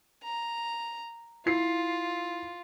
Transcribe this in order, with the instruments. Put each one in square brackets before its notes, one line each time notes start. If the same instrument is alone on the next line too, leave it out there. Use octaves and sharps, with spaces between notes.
[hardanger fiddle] A#5
[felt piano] E4 C7 [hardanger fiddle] F4